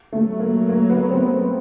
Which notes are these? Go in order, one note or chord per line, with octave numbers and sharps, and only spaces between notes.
A3
F#3
A#3
A#3
B3
C4